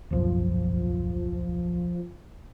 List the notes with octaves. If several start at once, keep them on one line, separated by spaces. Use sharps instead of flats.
D1 B1 F#2 F3